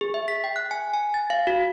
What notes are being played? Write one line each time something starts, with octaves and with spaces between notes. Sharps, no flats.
G#4
E5
B6
G5
F#6
G#5
G#5
A6
F5
F#4